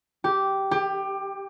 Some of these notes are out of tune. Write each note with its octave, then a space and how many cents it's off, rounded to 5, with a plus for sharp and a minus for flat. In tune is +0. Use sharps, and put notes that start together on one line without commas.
G4 -10
G4 +20